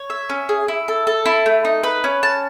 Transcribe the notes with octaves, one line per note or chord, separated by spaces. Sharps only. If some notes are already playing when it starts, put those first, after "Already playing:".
Already playing: C#5
E5
C#4
G#4
E4
A4
A4
E4
A3
D#4
B4
C#4
A5